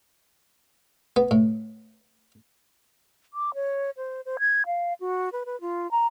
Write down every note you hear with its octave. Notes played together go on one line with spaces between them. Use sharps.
B3
A2
D6
C#5
C5
C5
G#6
F5
F#4
B4
B4
F4
A#5